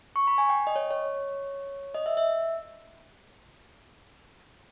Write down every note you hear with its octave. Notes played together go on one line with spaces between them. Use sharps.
C#6
B5
G#5
G5
D#5
C#5
C#5
D#5
E5
E5